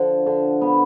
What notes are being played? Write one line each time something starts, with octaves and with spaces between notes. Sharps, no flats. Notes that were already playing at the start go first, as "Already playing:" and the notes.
Already playing: D3 F3
D3
B3